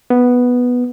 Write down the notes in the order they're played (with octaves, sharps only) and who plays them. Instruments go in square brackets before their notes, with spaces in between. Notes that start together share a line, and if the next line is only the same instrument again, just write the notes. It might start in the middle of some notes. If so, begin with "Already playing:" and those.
[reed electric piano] B3